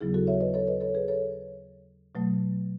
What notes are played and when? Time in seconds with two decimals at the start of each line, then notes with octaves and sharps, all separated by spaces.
0.01 D#2 C#3 F#3 B3 E4 G#4
0.14 F#4 A4
0.27 C#5 E5
0.40 B4 D#5
0.54 A4 C#5
0.67 B4 D#5
0.81 A4 C#5
0.95 G#4 B4
1.08 A4 C#5
2.15 B2 F#3 A3